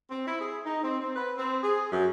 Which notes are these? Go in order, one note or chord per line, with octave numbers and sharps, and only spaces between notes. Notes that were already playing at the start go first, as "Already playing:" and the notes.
C4
E4
G#4
D#4
C4
C4
B4
C4
G#4
F#2